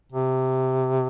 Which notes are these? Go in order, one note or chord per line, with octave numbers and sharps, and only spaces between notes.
C3